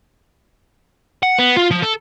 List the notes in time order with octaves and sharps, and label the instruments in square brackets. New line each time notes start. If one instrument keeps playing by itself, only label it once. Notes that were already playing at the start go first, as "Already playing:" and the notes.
[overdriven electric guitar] F#5
B3
F4
F3
A4